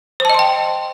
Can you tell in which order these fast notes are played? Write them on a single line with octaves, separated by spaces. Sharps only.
C5 A5 D#5 C6 G5